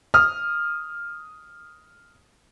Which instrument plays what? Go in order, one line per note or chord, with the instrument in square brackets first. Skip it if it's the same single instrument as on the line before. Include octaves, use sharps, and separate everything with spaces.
[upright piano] D#6 F6